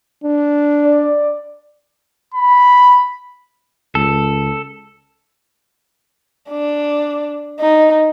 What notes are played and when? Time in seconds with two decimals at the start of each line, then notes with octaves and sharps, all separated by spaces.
0.24 D4
0.85 D5
2.35 B5
3.95 C#2 A4
6.50 D4
7.60 D#4